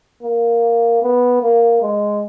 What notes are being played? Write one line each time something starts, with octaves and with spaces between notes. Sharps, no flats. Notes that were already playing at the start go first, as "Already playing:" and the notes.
A#3
B3
A#3
G#3